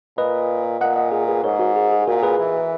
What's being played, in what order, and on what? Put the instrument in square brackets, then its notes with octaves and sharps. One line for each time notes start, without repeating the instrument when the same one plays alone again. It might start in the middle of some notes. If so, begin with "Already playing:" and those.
[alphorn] A#2 [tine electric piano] B4 D#5
[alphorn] A#2 [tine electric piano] D#5 F#5
[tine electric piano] D#5 F#5
G#4
G#4 B4
[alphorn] G#2 [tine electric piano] A#4 C#5
[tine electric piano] F#4 A#4
G#4
G#4
G#4
[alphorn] A#2 [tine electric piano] F#4 A#4
[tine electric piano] G#4 B4
[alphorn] E3